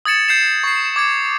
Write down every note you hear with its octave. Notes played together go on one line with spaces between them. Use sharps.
D#6 G#6 A6 C#7 E7
G6 C7 E7
C#6 C7
D6 G#6 C#7